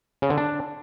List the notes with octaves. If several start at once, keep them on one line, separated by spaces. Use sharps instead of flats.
C#3
D3
D4